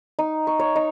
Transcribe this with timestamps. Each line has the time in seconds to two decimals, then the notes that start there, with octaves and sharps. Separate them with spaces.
0.19 D#4
0.47 C#6
0.59 C#5
0.76 D#4